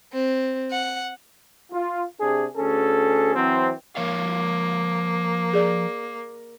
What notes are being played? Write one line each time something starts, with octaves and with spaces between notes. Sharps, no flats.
C4
F#5
F4
C3 D4 G#4
D2 C#4 G#4 A4
E3 F#3 C4
F3 A#3 C#5 F5
G#4 D5